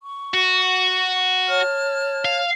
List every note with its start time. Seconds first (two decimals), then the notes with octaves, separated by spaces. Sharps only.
0.02 C#6
0.34 F#4
1.48 C#5 A5 F6
2.25 F5